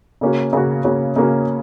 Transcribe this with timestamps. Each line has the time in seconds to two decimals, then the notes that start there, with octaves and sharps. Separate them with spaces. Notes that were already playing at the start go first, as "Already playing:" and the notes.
0.21 C#3 A#3 C#4 F#4
0.53 C#3 A#3 C#4 F#4
0.84 C#3 A#3 C#4 F#4
1.16 C#3 A#3 C#4 F#4